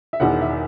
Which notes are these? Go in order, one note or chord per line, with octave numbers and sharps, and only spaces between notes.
E5
E1 E2 D#3 F#5
E5